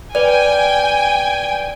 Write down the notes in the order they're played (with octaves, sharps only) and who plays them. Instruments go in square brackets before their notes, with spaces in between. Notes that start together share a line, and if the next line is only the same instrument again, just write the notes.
[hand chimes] B4 D5 [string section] G5 G#5